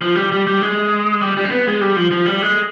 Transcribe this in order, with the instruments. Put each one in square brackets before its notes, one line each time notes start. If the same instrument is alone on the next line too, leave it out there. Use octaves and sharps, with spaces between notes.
[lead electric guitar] F3
G3
G3
G3
G#3
G3
G3
C4
B3
G#3
G3
F3
F3
G3
G#3